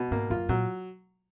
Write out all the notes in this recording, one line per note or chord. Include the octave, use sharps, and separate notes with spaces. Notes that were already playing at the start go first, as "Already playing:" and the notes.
Already playing: B2
G#2 A#3
F#2 F4
A#2 F#3